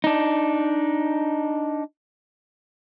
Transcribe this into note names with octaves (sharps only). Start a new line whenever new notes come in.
D4 D#4